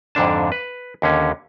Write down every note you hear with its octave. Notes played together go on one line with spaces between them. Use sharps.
F2 G#2 D3 D4 A5
B4
D#2 D3 C#4